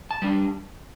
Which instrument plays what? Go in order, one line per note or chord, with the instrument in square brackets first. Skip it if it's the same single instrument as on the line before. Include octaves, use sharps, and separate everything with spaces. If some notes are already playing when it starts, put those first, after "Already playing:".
[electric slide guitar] A5
G3 D4